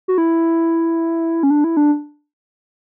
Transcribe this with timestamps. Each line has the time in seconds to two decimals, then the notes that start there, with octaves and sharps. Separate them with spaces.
0.08 F#4
0.18 E4
1.43 C#4
1.50 D4
1.64 E4
1.77 D4